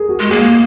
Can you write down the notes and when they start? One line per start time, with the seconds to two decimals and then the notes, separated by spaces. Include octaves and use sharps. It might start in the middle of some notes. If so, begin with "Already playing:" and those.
Already playing: G#4 A#4
0.09 F#4
0.20 G#3
0.30 A#3 G#4